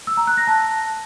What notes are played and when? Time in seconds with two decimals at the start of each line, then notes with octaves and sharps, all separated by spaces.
0.07 E6
0.17 A#5
0.27 F#6
0.37 A#6
0.47 A5